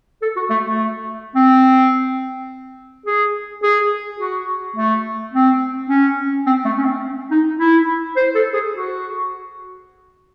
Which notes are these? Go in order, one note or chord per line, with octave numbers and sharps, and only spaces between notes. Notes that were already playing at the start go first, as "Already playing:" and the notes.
A4
F#4
A3
A3
C4
G#4
G#4
F#4
A3
C4
C#4
C4
A3
C#4
C4
D#4
E4
C5
A4
G#4
F#4